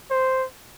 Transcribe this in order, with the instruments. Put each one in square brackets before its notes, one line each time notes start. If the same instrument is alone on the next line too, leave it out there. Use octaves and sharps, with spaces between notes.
[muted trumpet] C5